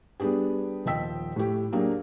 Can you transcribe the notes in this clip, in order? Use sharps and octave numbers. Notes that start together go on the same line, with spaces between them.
G3 B3 D4 G4 G#4
D#1 F3 D#5 G5 E6 B6
A2 G4
F#3 A#3 D4 G4 G#4